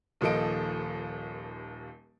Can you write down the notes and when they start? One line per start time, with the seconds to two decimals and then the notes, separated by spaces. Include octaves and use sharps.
0.21 D#1 D#2 F3 A4 D#5 D7